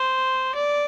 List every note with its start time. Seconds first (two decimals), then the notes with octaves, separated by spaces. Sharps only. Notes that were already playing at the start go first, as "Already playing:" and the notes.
Already playing: C5
0.55 D5